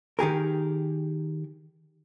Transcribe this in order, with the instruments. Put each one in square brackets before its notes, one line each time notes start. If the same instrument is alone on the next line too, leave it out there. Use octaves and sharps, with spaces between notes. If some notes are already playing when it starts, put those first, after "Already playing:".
[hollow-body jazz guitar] D#3 G4 G#4 A#4